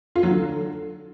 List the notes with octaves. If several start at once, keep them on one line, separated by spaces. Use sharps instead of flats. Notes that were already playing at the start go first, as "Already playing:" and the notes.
F4
F#3
D3